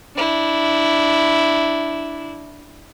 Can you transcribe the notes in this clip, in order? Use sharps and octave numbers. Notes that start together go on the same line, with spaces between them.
D4 E4